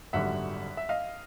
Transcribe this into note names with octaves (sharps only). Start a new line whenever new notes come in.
G#1 F#2 D3 G3 E5 F#5
E5
D#5 F5